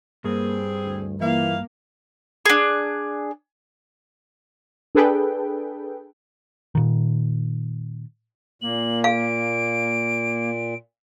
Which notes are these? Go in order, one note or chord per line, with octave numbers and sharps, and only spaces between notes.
G2 G3 A#3 C4 G#4
D2
A#2 E3 A#3 E4 F5
D4 G#4
D4 G#4 A4 B4 G5
A#2 D#3
A#2 A#3 F#7
F5 D7